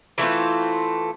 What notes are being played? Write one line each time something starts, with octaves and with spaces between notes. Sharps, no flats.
E3 A3 C4 F4